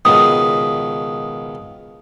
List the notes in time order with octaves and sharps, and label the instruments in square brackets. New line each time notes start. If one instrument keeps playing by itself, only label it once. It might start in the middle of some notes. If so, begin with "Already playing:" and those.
[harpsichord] C#2 B2 D#3 [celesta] D#6